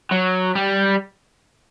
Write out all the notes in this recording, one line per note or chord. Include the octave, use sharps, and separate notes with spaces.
F#3
G3